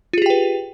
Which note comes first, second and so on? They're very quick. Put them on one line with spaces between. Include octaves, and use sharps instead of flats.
F4 G#4 G4 G5 B4